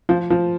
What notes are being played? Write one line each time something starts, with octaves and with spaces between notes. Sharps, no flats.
F3
F3